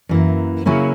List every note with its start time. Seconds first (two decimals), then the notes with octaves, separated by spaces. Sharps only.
0.09 F#2 E3 A#3
0.66 C#3 F#3 A#3 C#4 E4